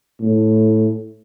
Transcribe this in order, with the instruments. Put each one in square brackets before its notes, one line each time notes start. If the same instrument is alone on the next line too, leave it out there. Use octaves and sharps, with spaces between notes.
[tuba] A2